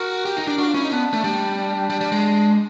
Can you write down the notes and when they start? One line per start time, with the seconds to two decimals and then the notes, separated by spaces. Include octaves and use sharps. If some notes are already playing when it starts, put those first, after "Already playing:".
Already playing: F#4 A#4
0.25 G4
0.37 D#4
0.47 D4
0.58 D4 F#4
0.66 F4
0.74 C#4 E4
0.83 D#4
0.91 B3 D4
1.13 A3
1.24 G3
1.57 D4
1.90 G3
2.01 G3
2.12 G#3